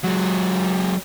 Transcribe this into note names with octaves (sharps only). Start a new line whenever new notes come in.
F#3 G#3